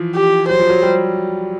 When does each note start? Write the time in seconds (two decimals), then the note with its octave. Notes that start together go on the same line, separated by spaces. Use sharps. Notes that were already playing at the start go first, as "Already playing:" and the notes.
Already playing: E3 F3
0.16 G4
0.49 F#3 C5
0.59 F3
0.69 F#3
0.82 G3